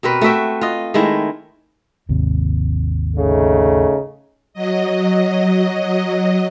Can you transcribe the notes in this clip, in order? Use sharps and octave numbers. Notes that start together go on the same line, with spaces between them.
B2 C4 A#4 B4
A3 F#4 E5 G5
F4 D#5
D#3 G#3 A3 E4
G#1 D#2 C3
C#3 A3 D#4
F#3 D#5